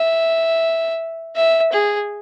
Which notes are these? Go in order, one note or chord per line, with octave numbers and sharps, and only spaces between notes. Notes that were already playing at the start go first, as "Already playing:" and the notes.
Already playing: E5
E5
G#4